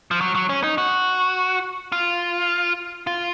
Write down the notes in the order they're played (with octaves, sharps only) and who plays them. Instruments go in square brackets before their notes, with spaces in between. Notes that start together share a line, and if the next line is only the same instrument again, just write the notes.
[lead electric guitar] F3
F#3
F#3
C#4
D#4
F#4
F4
F4